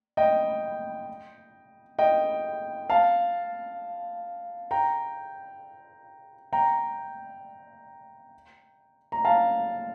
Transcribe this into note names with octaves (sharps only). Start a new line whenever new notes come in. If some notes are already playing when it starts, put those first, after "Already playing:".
D#5 G5
D#5 G5
F5 A5
G5 A#5
G5 A#5
A#5
F5 A5